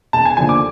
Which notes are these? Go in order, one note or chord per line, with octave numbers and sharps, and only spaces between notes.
E1 A5
G#5
D#2 D3 F3 G#5
D6